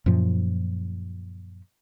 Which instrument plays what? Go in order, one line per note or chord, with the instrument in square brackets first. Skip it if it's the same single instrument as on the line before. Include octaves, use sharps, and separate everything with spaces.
[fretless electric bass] F#2 A#2 F3